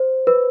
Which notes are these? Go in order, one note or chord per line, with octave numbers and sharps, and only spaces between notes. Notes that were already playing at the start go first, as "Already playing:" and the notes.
Already playing: C5
B4